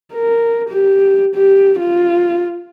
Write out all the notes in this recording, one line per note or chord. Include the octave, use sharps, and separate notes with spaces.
A#4
G4
G4
F4